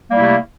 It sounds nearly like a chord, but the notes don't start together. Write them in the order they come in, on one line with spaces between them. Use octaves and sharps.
A#3 G3 E4 C3 A3